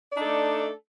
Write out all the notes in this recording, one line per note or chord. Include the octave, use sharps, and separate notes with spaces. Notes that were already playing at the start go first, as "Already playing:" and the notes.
A3 D4 D#4 A4 D5